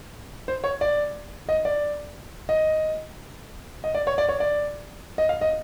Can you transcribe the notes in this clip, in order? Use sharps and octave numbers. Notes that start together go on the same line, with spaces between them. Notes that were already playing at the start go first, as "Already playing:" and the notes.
C5
C#5
D5
D#5
D5
D#5
D#5
D5
C#5
D5
C#5
D5
D#5
F5
D#5